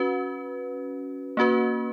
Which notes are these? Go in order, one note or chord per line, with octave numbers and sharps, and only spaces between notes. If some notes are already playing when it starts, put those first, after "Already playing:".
Already playing: C#4 F#4 B4
A#3 C#4 F#4 B4